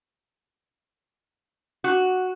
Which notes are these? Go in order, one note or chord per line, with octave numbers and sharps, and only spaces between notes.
F#4